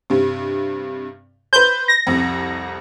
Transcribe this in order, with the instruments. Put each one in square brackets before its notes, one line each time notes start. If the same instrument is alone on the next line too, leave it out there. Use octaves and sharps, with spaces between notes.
[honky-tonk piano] G2 C3
[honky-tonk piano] B4 C5 [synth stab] G6
[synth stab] A#6
[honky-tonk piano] C2 F2